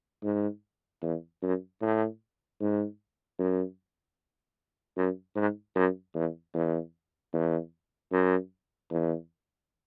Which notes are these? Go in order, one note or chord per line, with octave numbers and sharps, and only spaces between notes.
G#2
E2
F#2
A2
G#2
F#2
F#2
G#2
F#2
E2
E2
E2
F#2
E2